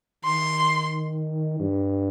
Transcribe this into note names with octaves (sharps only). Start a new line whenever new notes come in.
D#3 C6
G2